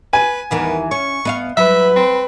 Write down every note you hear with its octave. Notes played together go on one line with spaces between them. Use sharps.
B4 G#5
D#2 E3 B3 A#4
C#4 C#6
B3 D#5 F5
F#3 B4 E5
C4